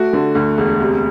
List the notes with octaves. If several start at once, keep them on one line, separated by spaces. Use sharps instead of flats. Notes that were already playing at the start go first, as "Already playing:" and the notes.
Already playing: A3 F#4
D3
D2
E1
C3